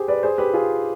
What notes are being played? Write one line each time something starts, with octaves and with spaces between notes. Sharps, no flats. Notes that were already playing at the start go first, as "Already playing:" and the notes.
Already playing: G4 G#4 C5
B4 D5
G#4 C5
G4 B4
F4 G#4